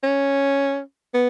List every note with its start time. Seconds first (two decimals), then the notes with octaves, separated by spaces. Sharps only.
0.04 C#4
1.14 B3